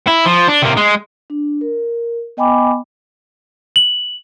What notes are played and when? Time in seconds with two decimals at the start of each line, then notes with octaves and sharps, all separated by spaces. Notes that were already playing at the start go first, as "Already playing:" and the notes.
0.07 E4
0.25 F3
0.48 D4
0.62 C3 A#3
0.77 G#3
1.30 D4
1.61 A#4
2.37 B3 D#5 G5 G#5 B5 D6
3.76 F#7